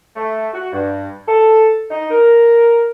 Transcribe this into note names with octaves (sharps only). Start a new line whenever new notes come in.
A3
F#4
G2
A4
D#4
A#4